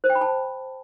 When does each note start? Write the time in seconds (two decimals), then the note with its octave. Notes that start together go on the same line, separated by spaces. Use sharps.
0.04 C5
0.10 G5
0.15 B5
0.21 A5